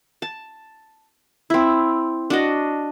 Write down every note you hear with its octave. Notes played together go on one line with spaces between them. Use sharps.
A5
C4 E4
D4 F#4 D#5